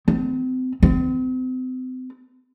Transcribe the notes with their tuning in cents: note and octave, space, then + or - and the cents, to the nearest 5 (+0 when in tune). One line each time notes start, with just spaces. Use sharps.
C4 -35
C4 -40